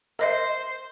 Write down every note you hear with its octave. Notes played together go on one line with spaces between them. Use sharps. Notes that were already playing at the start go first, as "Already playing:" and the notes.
A#4 C5 D#5 E5